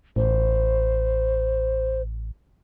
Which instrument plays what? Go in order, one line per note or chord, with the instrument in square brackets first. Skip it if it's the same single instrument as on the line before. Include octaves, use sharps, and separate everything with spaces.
[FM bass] A1 [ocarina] C5